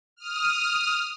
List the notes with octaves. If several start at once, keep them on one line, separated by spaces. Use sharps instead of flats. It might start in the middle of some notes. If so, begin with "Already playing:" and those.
D#6 F6